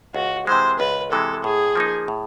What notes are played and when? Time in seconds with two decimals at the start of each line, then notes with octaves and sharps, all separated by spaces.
0.14 C#2 F#4
0.47 C3 E3 G#3 C5
0.79 C#2 B4
1.11 C3 E3 G#3 A4
1.44 A2 G#4
1.75 F3 A#3 D#4
2.08 A2